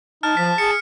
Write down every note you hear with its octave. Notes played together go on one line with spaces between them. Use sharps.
D#4 A5 F6
F3 B6
G#4 C#7